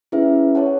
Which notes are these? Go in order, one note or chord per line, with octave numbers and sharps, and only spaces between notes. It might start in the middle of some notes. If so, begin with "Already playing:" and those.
C#4 E4 G#4 B4 E5
G#4 C#5 F#5 A5